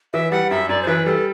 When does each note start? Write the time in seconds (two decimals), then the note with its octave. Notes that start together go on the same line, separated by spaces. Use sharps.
0.13 E3 E5
0.31 G3 F#5
0.50 F#2 E5
0.69 F#2 D5
0.82 C5
0.87 E3 B4
1.06 G3 A4